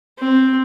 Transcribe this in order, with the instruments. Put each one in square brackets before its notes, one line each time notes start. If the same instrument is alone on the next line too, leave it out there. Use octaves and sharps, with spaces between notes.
[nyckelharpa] C4